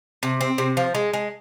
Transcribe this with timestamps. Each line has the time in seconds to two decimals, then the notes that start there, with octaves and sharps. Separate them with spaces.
0.23 C3
0.41 C4
0.58 C3
0.77 F3
0.95 G#3
1.14 G#3